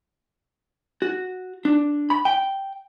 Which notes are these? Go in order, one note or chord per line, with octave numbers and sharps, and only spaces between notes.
F#4
D4
B5
G5